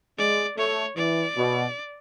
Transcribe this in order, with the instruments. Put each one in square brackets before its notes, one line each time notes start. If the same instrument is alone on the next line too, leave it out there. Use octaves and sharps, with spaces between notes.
[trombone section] G#3 [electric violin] D5
[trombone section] A3 [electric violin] C#5
[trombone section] E3 [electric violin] D5
[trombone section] B2